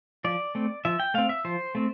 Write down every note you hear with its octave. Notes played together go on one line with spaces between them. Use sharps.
F3 D5
A3 C4
F3 E5
G5
A3 C4 F5
E5
F3 C5
A3 C4